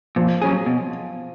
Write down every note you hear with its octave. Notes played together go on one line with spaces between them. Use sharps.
A#2 F3
F#3 C#4 G#4
B2